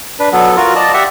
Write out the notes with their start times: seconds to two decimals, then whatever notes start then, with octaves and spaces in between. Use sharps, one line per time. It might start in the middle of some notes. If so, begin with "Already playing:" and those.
0.20 D4 B4
0.33 F#3 B3 A4
0.56 F4 F#4 A#4
0.76 D5 D#5 A5
0.94 G4 E5 F#5